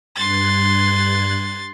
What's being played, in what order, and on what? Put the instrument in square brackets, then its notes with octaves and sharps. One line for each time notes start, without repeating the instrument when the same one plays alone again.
[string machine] G2 F#6 G#6 [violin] C6 A6